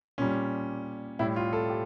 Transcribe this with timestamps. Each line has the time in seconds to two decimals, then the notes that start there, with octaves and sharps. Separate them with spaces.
0.18 A#2 G3 C#4
1.19 A2 G3 E4
1.36 F4
1.53 A4
1.70 G4